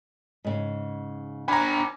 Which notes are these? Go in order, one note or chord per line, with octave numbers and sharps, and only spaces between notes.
G#2 C#3
D4 G#5 A#5 B5